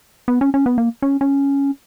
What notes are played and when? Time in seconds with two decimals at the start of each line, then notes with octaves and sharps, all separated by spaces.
0.28 B3
0.41 C#4
0.54 C#4
0.66 B3
0.78 A#3
1.02 C#4
1.21 C#4